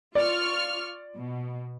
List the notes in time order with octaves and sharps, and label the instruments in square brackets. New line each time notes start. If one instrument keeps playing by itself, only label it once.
[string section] F4 C#6 F6 [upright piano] D5
[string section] B2